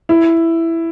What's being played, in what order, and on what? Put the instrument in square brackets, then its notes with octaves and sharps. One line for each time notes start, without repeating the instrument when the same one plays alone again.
[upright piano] E4